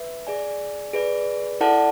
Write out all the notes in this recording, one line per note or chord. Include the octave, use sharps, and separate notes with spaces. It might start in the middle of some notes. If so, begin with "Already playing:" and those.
Already playing: B4 E5
G#4 D5 G#5
G#4 B4 D5
E4 A4 D5 F#5 A5